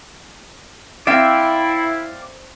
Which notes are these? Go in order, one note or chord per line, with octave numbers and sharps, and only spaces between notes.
C4 E4 D5 E5 F5 G5